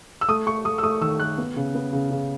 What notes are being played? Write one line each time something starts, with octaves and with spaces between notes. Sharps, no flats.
E6
A3 D#6
A3 C#6
A3 D#6
E6
A3 D#6
D#3 E6
A3 F#6
B3
C#3
B3
C#3
C#3